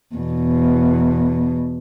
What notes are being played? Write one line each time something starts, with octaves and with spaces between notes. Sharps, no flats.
E2 B2